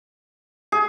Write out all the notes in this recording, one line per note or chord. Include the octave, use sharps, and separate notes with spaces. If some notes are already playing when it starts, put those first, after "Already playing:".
G#4